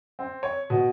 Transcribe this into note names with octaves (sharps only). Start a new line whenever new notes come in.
C4
C#5
B2